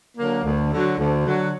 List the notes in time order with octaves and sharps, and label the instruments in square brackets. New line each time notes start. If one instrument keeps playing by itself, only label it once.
[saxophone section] D3 F#3 A#3
D2
D3 F#3
D2
D3 F#3